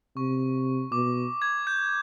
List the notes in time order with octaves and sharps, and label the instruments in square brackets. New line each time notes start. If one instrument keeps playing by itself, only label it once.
[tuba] C3 [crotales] C#6
[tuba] B2 [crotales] D6
[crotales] G#6
G6